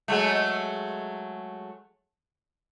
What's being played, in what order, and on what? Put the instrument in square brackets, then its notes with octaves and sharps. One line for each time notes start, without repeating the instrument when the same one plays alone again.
[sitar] F#3 G#3 A3